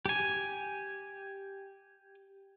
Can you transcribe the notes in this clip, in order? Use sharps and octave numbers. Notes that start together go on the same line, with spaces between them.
G4 G#5